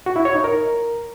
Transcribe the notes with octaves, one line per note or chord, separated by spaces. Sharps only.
F#4
E4
C#5
D#4
A#4